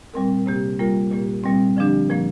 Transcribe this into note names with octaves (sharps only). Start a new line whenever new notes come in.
A#2 G3 C4 A#4
C3 A#3 G4
G3 A#3 F4 A#4
A#2 A#3 G4
A#2 G3 C4
D3 F3 D4 G4
A#2 F3 A#3